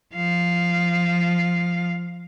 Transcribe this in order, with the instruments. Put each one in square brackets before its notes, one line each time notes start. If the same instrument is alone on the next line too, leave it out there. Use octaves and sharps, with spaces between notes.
[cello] F3 F5